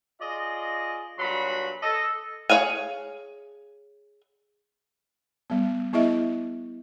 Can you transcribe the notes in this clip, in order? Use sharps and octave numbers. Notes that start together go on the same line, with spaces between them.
F4 G#4 D5 D#5
G2 A#2 F#3 F#4 B5 C6
A4 D#5
G#4 C#5 F5 G#5
G3 B3
B3 E4 G#4 D#5 E5